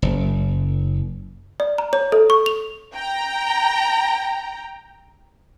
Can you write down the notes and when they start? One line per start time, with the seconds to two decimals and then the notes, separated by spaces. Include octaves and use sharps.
0.02 F#1
1.60 D5
1.78 A#5
1.93 C#5
2.12 A4
2.30 C#6
2.46 F7
2.96 G5 A#5